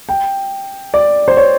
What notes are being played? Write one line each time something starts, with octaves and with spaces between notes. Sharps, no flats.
G5
D5
C5
C#5